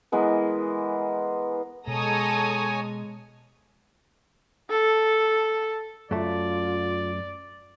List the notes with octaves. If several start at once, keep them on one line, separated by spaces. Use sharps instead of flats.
E3 G#3 B3 A#4
B2 G#3 A4 C#5 G#5 A#5 D#6
A4
F#2 A3 F4 D5